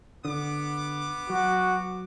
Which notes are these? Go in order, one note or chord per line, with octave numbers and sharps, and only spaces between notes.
D3 B3 D6
F#3 F#4